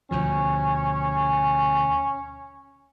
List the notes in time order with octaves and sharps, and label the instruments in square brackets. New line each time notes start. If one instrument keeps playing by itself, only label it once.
[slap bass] D2 B2 F3 [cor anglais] C#4